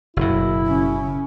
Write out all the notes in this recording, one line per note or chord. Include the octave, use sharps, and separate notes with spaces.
F#1 B2 E4
C#3 C#4